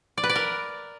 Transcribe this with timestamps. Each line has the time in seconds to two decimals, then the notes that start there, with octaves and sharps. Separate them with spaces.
0.18 D5
0.24 B4
0.30 D5
0.36 A#4